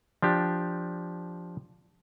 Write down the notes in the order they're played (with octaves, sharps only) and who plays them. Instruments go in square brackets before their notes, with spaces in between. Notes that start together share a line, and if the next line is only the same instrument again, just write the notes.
[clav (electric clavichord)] F3 D4 G4